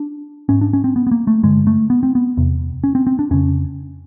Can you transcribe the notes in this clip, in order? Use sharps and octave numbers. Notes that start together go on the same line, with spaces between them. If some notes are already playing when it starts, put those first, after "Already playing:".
Already playing: D4
G#2 C#4
D4
C#4
C4
B3
B3
A#3
A3
G2 D3 G#3
A3
B3
C4
B3
E2 C3
C#4
C4
C4
D4
F2 C#3 C#4